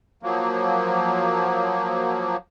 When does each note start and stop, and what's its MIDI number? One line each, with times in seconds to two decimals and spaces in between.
0.23 2.37 53
0.23 2.37 54
0.23 2.37 58